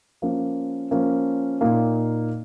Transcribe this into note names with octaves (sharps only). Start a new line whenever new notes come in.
F3 A#3 C#4
F3 A#3 C#4
A#2 A#3 D#4